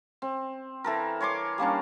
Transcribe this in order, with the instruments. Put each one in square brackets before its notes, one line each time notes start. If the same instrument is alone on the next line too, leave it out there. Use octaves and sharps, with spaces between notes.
[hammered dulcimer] C4
E3 A4 A#4
C#5 G#5 C6 D6
G3 A#3 C#4 D4